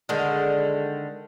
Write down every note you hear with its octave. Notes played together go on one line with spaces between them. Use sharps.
D3 D#3 G#3